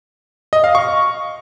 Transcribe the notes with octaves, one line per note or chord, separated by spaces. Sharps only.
D#5
F5
C#6